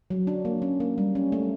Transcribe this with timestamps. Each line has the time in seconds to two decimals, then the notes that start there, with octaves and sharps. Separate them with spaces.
0.10 F#3
0.27 D4
0.45 A#3
0.62 C#4
0.80 A#3
0.98 G3
1.15 C#4
1.32 A3